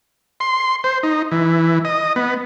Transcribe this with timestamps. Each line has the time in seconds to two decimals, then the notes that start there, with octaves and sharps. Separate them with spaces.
0.40 C6
0.84 C5
1.03 D#4
1.31 E3
1.85 D#5
2.16 B3